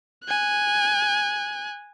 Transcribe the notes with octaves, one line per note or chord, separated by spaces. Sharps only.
G#5 F#6